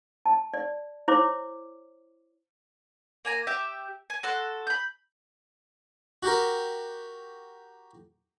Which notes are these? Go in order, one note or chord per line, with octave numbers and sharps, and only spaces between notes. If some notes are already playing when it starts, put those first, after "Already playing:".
A5
D5
E4 C5 C#5 D6
A#3 G#5 A#5
G4 E5 G5
G#5
F#4 A4 C6 F#6
B5 G6
F#4 G4 A#4